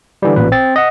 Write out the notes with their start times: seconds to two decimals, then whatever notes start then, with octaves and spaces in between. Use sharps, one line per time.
0.22 D3 E3 G3
0.36 A1 A#2 B4
0.52 C4 A6
0.76 D#5 F#5